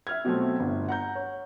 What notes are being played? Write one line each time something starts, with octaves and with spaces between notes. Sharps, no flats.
E5 F6 G#6
B2 F#3 A3 C4
G1
F#5 A#5 G6
C#5